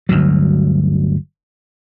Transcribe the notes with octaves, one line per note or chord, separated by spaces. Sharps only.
G1 D2 F#3